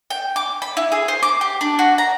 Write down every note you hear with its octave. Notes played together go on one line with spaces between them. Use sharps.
G5
D6
B5
E4
G#4
C5
D6
G4
D4
F#4
A#5